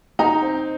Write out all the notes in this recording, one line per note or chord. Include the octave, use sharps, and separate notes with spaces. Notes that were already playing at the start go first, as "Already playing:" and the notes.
D#4 A#5
C4